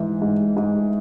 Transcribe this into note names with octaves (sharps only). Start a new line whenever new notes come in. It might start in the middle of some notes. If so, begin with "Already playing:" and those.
Already playing: G#2 E3
G#2
G#2